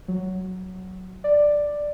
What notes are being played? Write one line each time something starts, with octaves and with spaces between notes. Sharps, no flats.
F#3
D5